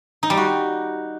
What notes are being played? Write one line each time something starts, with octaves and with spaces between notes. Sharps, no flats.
D#4
G3
F#4